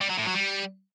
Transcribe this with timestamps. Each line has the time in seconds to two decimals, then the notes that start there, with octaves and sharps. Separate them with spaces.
0.01 G3
0.09 F#3
0.18 A2
0.26 F#3
0.34 G3